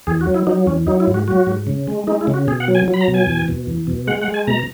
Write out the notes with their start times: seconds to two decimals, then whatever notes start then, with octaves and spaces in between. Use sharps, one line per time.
0.07 E2 G#4
0.21 F#4
0.27 F#3
0.34 E4
0.47 F#3 D#4
0.67 E2 C#4
0.87 F#3 D#4
1.00 E4
1.07 G#2
1.14 F#4
1.28 F#3 F#4
1.47 G#2
1.67 C#3
1.87 G#3
2.07 G#3 D#4
2.21 E4
2.27 C#3
2.34 F#4
2.47 B2 G#4
2.60 F#5
2.68 F#3
2.75 G#5
2.88 F#3
2.94 B5
3.01 A#5
3.08 B2
3.14 G#5
3.27 E2
3.48 B2
3.67 E2
3.87 B2
4.07 G#3 F#5
4.21 F#5
4.28 G#3
4.34 G#5
4.47 B2 A#5